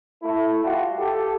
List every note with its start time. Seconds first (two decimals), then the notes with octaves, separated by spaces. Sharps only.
0.23 A3 E4
0.65 G3 F4 F#4
0.98 G4 A4